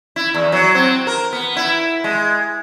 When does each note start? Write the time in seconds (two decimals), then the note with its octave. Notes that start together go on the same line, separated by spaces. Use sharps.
0.16 E4
0.34 E2
0.52 F#3
0.75 C4
1.07 A#4
1.33 B3
1.57 E4
2.04 G#3